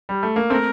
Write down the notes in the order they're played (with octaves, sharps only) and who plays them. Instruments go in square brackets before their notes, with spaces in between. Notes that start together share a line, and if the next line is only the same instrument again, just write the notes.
[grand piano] G3
A3
A#3
[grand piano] A3 C4 [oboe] A#4